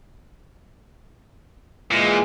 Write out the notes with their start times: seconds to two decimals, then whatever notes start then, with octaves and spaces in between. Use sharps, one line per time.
1.91 A#2 E3 G#3